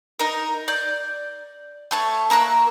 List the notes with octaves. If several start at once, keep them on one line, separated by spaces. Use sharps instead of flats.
D#4 A#4
D5 G6
A3 A4 C#5
A#3 A#4 E6 F#6